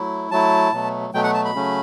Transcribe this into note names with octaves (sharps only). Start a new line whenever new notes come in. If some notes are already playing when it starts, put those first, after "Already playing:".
Already playing: F#3 A3 E4
F#3 A3 E4 A5
B2 F#3 A3
B2 F#3 A3 G5
F#5
A5
B5
C#3 F#3 A3 C#4